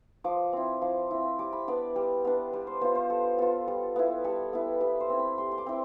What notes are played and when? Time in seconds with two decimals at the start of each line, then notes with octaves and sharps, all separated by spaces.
0.24 F3 D6
0.53 C4 E4
0.82 F3 D6
1.11 C4 E4
1.39 G3 D6
1.53 B5
1.68 B3 D4 D5
1.96 G3
2.25 B3 D4
2.53 G3
2.67 C5
2.81 B3 F4 C5
2.95 C5
3.10 G3 A4
3.38 B3 F4 A4
3.68 G3
3.96 B3 E4
4.24 G3 A4
4.53 B3 E4
4.81 G3 B4
5.00 C5
5.10 C4 E4
5.19 B5
5.38 G3 C6
5.52 C6
5.58 D6
5.66 C4 E4